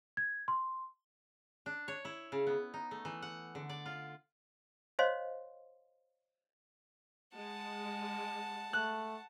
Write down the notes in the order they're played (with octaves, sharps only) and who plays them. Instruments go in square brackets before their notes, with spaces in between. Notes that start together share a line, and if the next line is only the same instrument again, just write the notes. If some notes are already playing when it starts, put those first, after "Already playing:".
[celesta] G#6
C6
[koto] D4
C#5
E4
C#3
B3
D#4
A3
E3
F#5
D3
D5
F4
[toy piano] C5 C#5 D#5 F5 C6
[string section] G#3 [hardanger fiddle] F#5 A5
[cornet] A3 [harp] F#6